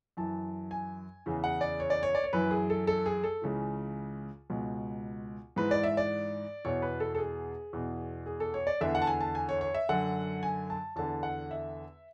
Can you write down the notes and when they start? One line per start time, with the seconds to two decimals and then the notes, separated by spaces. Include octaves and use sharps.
0.17 F#2 E3 A5
0.71 G#5
1.26 E2 C#3 E3
1.44 F#5
1.61 D5
1.80 C#5
1.90 D5
2.03 C#5
2.15 D5
2.24 C#5
2.33 F#2 E3 B4
2.51 G#4
2.70 A4
2.87 A4
3.06 G#4
3.24 A4
3.42 C#2 C#3 E3
4.50 C#2 B2
5.56 G#2 E3 B4
5.71 D5
5.84 E5
5.97 D5
6.65 E2 B2 C#5
6.82 B4
7.00 A4
7.15 A4
7.18 G#4
7.73 E2 B2
8.26 G#4
8.40 A4
8.54 C#5
8.67 D5
8.81 E2 D3 E5
8.95 F#5
9.02 A5
9.07 G#5
9.21 A5
9.35 G#5
9.49 C#5
9.61 C#5
9.74 E5
9.89 F#2 D3 F#5
10.43 G#5
10.70 A5
10.96 E2 D3 A5
11.23 F#5
11.51 E5